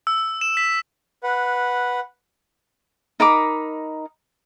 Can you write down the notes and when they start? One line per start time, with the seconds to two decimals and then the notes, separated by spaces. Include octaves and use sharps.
0.07 E6
0.41 E7
0.57 B6
1.23 B4 F#5
3.20 D#4 A#4 B5 D6